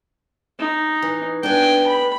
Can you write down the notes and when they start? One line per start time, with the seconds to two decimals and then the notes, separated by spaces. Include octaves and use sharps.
0.59 D#4
1.02 E3
1.43 B3 D4 G5 G#5
1.86 B5